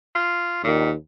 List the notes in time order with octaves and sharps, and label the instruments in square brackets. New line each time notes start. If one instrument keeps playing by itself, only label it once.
[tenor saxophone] F4
[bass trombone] D#2 [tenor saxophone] A#2